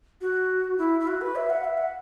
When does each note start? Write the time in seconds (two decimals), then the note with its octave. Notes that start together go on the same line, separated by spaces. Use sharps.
0.21 F#4
0.78 E4
1.00 E4
1.07 F#4
1.21 B4
1.36 E5
1.50 F#5
1.64 E5
1.78 F#5